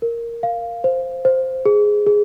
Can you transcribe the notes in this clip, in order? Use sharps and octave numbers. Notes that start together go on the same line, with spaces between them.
A#4
F5
C5
C5
G#4
G#4